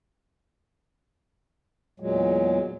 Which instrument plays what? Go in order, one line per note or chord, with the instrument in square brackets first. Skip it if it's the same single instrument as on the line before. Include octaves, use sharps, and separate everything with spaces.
[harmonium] E2 A#2 F#3 G#3